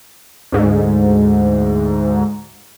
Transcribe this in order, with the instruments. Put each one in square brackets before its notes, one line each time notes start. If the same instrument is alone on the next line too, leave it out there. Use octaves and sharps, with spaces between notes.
[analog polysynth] D2 G#2